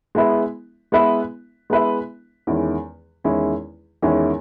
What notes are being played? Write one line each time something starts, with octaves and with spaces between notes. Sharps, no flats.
G#3 B3 E4 B4 E5
G#3 B3 E4 B4 E5
G#3 B3 E4 B4 E5
E2 D#3 G#3 C#4 E4
E2 D#3 G#3 C#4 E4
E2 D#3 G#3 C#4 E4